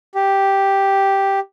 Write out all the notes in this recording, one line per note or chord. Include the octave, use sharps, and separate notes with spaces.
G4